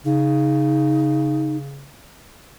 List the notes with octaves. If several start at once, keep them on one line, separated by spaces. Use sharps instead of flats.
C#3 D#4